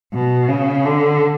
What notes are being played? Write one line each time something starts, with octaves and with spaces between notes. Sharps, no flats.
B2
C#3
D3